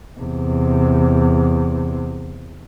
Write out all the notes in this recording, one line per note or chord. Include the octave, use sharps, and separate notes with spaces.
E2 C3